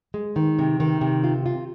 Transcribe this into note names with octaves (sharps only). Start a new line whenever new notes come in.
G#3
D#3
C3
D#3
C3
F4
F4